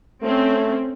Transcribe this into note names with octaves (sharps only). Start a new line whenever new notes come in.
A3 C4 C#4